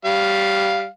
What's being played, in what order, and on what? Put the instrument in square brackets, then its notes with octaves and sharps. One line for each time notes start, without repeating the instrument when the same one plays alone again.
[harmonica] G3 F5